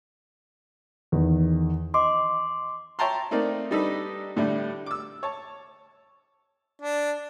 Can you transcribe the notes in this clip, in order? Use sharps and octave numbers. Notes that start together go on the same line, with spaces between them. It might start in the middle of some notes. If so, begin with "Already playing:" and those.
E2 D#3
D#5 C6 D6
C#5 E5 G5 A5 A#5 C6
A3 A#3 C4 D#4 A#4 D5
G3 D4 D#4 G4 A4 B4
A2 D3 G3 A3 D4
D6 E6
C#5 A5
D4